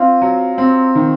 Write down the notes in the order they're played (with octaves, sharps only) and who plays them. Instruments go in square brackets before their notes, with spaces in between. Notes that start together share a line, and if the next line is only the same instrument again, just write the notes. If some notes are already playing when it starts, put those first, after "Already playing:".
Already playing: [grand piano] C4 F4
F#3
C4
D#3